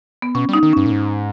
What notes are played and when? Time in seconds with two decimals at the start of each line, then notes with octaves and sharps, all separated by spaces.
0.22 B3
0.35 B2 C#4
0.49 G3 D#4
0.63 D#3
0.73 G2 C#4
0.86 A#2
0.91 G#2